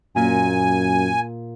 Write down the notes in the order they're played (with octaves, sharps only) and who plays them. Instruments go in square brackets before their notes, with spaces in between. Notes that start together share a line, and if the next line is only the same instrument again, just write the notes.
[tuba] F#2 [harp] A#2 [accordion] G#5